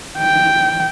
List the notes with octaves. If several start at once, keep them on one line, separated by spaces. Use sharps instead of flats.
G5